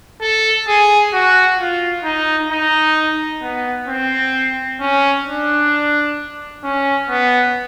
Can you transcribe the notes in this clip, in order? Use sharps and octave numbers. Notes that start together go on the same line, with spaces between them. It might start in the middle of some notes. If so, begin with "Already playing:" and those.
A4
G#4
F#4
F4
D#4
D#4
B3
C4
C#4
D4
C#4
B3